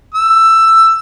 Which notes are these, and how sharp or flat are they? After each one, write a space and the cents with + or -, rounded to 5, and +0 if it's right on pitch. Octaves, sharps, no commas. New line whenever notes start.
E6 +10